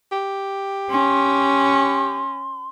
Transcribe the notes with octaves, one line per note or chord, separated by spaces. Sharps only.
G4
C#4 C6